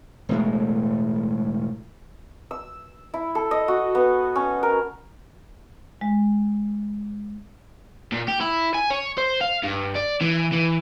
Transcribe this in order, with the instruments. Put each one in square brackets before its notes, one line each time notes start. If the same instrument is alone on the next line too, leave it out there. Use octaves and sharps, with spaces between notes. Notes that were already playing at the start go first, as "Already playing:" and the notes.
[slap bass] E1 A2 G#3
[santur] E6
E4
A4
D#5
F#4
B3
C#4
A#4
[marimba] G#3
[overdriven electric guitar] A#2
G4
E4
G#5
C#5
C5
F5
G2
D5
E3
E3